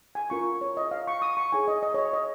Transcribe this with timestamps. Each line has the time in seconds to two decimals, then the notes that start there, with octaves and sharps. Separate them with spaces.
0.15 G#5
0.30 C#4 F4 A#4 C#6
0.61 C#5
0.77 D#5
0.91 F5
1.07 C#6
1.22 D#6
1.37 C#6
1.52 D#4 G#4 C#5 G#5
1.68 D#5
1.83 D#5
1.94 C#5
1.98 D#5
2.13 D#5